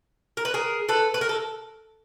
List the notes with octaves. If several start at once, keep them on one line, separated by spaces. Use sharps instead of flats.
A#4
B4
G#4 A#4
A4 B4
B4
A#4
A4